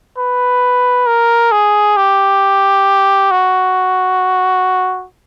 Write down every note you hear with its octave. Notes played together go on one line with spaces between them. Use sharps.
B4
A#4
G#4
G4
F#4